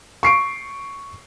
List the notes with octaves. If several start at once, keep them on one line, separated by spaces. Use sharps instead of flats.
C#6 C7 D7